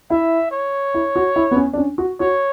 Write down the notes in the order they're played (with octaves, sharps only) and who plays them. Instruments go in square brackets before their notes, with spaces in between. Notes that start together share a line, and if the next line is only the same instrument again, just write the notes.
[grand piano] E4 [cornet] E5
[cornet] C#5
[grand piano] E4
F#4
E4
B3
C#4
D4
C#4
F#4
[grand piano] F#4 [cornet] C#5